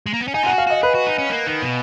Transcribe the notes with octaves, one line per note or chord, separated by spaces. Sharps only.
G#3
A#3
B3
C#4
D#4 G#5
F4
F#4 F#5
F5
F#4 D#5
G#4 B4
F#4
D#4
C#4
A#3
D#3
B2